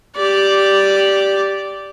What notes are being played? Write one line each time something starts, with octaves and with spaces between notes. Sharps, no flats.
G4 D5